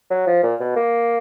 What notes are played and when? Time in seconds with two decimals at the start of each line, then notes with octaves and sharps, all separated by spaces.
0.10 F#3
0.27 F3
0.43 A#2
0.60 B2
0.76 A#3